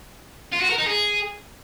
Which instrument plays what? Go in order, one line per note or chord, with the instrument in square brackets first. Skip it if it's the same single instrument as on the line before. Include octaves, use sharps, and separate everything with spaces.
[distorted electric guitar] F4
F#4
A#4
D#4
G#4